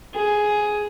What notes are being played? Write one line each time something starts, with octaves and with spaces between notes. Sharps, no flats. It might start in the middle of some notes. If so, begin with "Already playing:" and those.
G#4